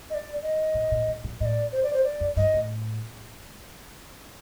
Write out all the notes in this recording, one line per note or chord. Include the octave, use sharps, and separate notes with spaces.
D#5
D5
D#5
A#2
A#2
A#2
A#2
A2 D5 D#5
C5
D5
C5
D5
F2
G2 D#5
A2